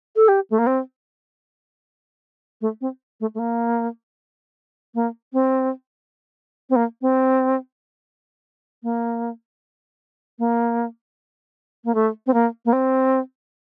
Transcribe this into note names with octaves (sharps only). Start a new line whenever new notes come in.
A4
G4
A3
A#3
C4
A3
C4
A3
A3
A#3
A#3
C4
C4
A#3
C4
A#3
A#3
A#3
A3
C4
A#3
A#3
C4